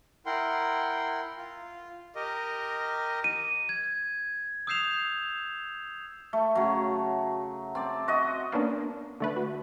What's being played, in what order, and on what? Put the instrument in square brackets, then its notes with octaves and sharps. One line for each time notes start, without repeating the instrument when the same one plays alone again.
[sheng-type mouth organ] E4 A#4 F#5 G5 C6
F4
G4 A#4 D#5
[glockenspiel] D#7
G#6
D#6 E6 G6 C7 E7 F7
[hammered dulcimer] A3
C#3 F#3
C4 D5
F#4 D#5
[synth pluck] A#3 B3 C#4 D4
D3 A3 B4
F#4